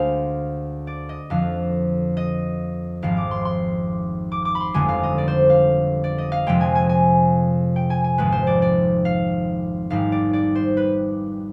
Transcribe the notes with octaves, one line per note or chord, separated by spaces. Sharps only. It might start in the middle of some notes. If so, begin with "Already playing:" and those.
Already playing: D2 D3 G#3 C5 F5
D5
D#5
F2 D3 F3 F5
D#5
G#1 G#2 F3 F5
D6
C6
C6
D6
D6
B5
C6
G1 F2 D3 G#3 G#5
F5
D#5
D5
C5
F5
D5
D#5
F5
F2 C3 F3 G#3 G5
G#5
G#5
G#5
G5
G#5
G#5
G#1 G#2 F3 G#3 B4
C5
D5
D5
F5
G#1 G#2 D#3 G3 F5
D5
D5
C5
B4